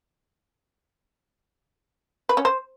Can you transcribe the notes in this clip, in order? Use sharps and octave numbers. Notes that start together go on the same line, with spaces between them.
B4
C#4
C5